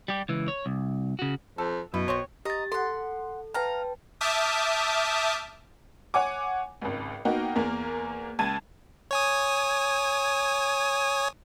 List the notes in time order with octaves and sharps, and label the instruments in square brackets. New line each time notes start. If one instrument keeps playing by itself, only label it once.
[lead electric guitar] G3 G4
C#2 E3
C#5
C2
C#3 F#4
[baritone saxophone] F2 [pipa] A4
[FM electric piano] F#2 [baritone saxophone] B2 [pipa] E4
[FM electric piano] B1 [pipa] C4 C5 C#5
[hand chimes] G4 A6 [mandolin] D#5 A#5
[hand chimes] A4 [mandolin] F#5 C6
[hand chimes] B4 G5 A5 [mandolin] F5 A#5
[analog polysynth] E5 A5 D6 D#6 F6 G6
[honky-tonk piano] C#5 F#5 G#5 D6
G#1 C#2
A#3 B3 D#4 F#4 G5
E2 A#3
C#2 A5 G#6 D#7
[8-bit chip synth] C#5 G#5 D#6